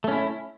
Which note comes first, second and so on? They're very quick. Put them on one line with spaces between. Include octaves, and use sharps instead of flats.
A3 C#4 E4